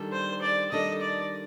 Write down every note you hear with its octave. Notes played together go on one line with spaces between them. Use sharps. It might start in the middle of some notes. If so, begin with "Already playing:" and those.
Already playing: D#3 G3 D4 A4
C5
D5
D#3 G3 D4 A4 D#5
D5